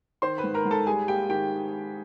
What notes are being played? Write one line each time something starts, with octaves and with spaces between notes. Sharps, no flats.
D#3 C5 C6
B4 B5
G#2
A#4 A#5
G#2
A4 A5
G3 G#4 G#5
A#3 G4 G5
D#3 G4 G5